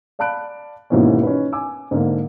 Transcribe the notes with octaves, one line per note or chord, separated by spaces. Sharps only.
D5 F5 A5 B5 F#6 D7
D#2 G#2 B2 E3 A#3 C#4
C#4 D#4 B4
G#5 D6 E6
G#2 D3 A#3